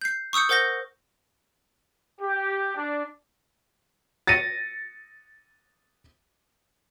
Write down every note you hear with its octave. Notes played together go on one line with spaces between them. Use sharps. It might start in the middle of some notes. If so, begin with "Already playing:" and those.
G6 C7
C#6 D#6 E6 G6 C#7
A#4 C5 F#5 G6 A#6 G7
G4
D4
A6 A#6 C#7 D#7